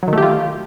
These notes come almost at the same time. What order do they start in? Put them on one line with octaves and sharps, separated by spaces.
F#3 D#3 A3 G4 F4